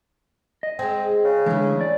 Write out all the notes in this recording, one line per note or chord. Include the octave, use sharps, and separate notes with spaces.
D#5
G#3 C4 G#4
C#3
D3 E3 G#3 A3 E4
D5